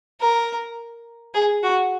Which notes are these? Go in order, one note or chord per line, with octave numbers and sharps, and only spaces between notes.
A#4
G#4
F#4